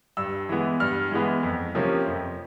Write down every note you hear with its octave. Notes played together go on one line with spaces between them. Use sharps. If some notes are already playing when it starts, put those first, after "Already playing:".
G2 E6
E3 G#3 B3
G2 F6
E3 G#3 B3
F2
C3 F3 A#3 C#4
F2